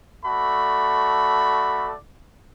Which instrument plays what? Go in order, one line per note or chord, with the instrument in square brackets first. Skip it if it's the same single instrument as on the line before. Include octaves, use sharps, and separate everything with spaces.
[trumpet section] A3 F#4 A4 D5 B5